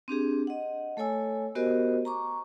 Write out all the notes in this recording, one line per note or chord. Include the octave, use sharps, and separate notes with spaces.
C4 D4 G4 G#4
D#5 F#5
A3 A4 C#5 G#5 E6
B3 F#4 G4 A#4 C5 D#5
A#5 C#6 D6